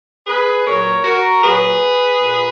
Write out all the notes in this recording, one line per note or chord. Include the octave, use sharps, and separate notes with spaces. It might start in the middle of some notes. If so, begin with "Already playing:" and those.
G#4 B4
A#2 F#3 A#4 C#5
F#4 A#4
A#2 F#3 G#4 B4
A#2